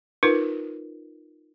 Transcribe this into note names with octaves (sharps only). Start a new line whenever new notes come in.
D#4 F4 A#4 B4